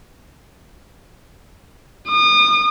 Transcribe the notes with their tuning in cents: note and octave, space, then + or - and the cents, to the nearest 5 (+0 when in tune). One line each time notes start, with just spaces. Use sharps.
D#6 -35